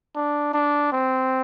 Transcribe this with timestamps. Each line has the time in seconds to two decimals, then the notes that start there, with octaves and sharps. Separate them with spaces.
0.15 D4
0.53 D4
0.92 C4